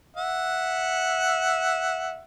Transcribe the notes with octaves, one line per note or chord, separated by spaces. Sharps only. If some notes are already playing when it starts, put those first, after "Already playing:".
E5 F#5